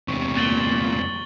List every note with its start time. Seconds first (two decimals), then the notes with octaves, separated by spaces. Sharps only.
0.08 E2 C3 C#6
0.37 A#2 A6 F#7 G7